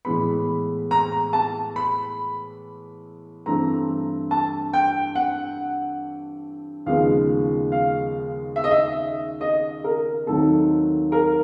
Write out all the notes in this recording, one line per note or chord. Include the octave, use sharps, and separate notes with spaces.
A2 E3 G#3 B3 B5
A#5
A#5
A5
B5
G2 E3 A3 C4 A#5
A5
G5
F#5
D#2 C#3 F3 G#3 B3 F5
F5
E5
D#5
E5
D#5
A#4
D#2 D#3 F#3 A3 C4 A4
A#4